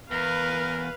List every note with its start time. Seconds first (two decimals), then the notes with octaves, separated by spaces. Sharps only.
0.11 E2 A#4 B4 F5